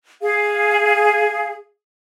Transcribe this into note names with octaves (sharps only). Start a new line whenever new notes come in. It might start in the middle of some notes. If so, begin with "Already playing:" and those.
G#4 F5